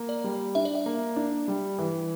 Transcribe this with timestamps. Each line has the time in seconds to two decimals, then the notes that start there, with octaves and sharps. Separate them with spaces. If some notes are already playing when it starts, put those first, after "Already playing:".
Already playing: A#3
0.09 D5
0.24 G3
0.55 D4 E5
0.65 D5
0.75 E5
0.86 A#3
1.16 D4
1.48 G3
1.79 E3